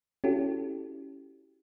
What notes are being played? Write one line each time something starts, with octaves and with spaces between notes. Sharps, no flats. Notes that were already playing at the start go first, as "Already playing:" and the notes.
C#4 E4 F#4 G4 A4